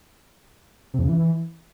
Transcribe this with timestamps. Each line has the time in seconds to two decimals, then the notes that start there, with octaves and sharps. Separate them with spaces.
0.94 C3
0.99 E2
1.04 C#3
1.09 E3